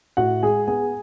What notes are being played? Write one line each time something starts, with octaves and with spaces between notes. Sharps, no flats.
A2 F#4 F#5
G#3 G#4 G#5
B3 G#4 G#5